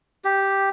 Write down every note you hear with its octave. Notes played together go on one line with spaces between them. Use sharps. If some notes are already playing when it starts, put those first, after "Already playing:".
G4